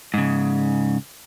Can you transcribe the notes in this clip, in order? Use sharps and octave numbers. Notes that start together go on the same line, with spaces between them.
G#2 C#3